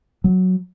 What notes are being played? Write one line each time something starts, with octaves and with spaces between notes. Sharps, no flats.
F#3